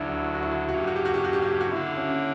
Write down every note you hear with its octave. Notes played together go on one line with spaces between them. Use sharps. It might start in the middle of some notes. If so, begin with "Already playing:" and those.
Already playing: D2 D3 F#3 D4 E4
F#4
E4
F#4
E4
F#4
G2 F#3 A#3 F#4
G4
F#4
G4
F#4
G4
F#4
G4
F#4
G4
F#4
D3 A#3 D4 E4
C#4